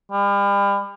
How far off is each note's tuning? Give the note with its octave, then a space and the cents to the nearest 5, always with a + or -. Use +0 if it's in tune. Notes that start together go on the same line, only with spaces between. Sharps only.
G3 +40